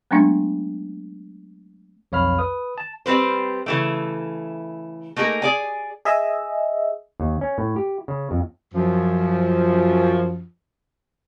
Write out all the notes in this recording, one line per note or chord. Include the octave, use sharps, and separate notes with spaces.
F#3 G#3 A3 B3 C#4 D4
B1 F2 C#5 F5 B5 F6
B4 D#6
A5
G3 C4 B4 C5
C#3 E3 A3
A3 A#3 D#4 G#4 A#4
G#4 D5 G#5
G#4 D#5 E5
D#2
C#4
A2
G4
C#3
F2
F#2 F3